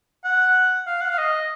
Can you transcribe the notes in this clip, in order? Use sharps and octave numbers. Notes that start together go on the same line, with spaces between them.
F#5
F5
F#5
F5
D#5